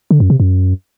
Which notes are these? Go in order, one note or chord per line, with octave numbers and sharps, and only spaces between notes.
D3
F#2
C3
F#2